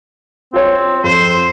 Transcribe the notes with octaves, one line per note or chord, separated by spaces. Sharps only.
C4 F4 C#5
F2 C5